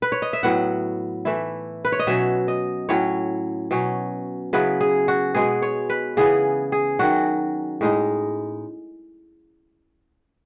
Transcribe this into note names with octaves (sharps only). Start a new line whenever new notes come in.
B4
C#5
D#5
E5
A2 F#3 B3 F#5
E3 A3 E4
B4
C#5
D#5
B2 F#3 C#4 E5
D#5
A2 F#3 C#4 E4 C#5
B2 F#3 C#4
C#3 F#3 B3 E4 B4
G#4
F#4
B2 G#3 B3 G#4
C#5
B4
C#3 E3 B3 G#4
G#4
D#3 F#3 C#4 F#4
A2 G#3 D#4